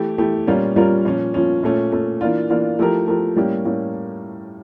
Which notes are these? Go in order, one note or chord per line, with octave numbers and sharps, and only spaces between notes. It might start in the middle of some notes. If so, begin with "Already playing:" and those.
Already playing: E3 A3 E4 G4
E3 A3 E4 G4
A#2 G3 C#4 F4 A#4
A#2 G3 C#4 F4 A#4
A#2 F3 C#4
A#2 F3 C#4
A#2 A3 C#4
A#2 A3 C#4
E3 A#3 D4 F4
E3 A#3 D4 F4
F3 A3 E4 G4 A#4
F3 A3 E4 G4 A#4
A2 G3 A#3 C#4 G4
A2 G3 A#3 C#4 G4